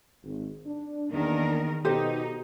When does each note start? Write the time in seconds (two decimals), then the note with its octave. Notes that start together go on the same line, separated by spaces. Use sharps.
0.23 G#1
0.66 D4
1.12 E2 D#3 A#3 D4 A#4
1.85 B2 D#4 G4 A4 C5